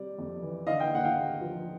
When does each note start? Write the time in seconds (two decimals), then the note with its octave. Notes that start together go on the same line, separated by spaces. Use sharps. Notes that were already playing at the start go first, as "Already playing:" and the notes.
Already playing: C3 G3 D5
0.18 F2
0.42 E3
0.67 D3 D#5 F5
0.79 F5 G5
0.92 D#2 F#5
1.04 F5 G5
1.16 D#2
1.41 F3